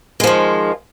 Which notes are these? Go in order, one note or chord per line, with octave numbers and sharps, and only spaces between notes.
D#3 F3 G#3